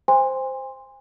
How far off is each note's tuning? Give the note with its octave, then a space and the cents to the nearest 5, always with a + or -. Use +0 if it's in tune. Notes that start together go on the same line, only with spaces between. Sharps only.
C5 +0 G#5 -40 C6 +0